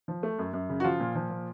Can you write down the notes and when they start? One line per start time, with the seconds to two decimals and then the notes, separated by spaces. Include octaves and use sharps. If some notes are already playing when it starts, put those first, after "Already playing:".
0.08 F3
0.23 A3
0.39 F#2
0.53 F#2
0.69 C#3
0.80 F#4
0.84 F3 F4
1.00 A#2
1.15 F3
1.30 A#2